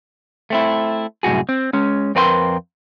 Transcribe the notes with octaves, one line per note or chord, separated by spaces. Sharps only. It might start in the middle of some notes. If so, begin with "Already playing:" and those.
A3 C4 E4
C2 F#2 A2 F#4 G#4
C4
G#3 C#4
F2 C4 A#4 B4 G5 C6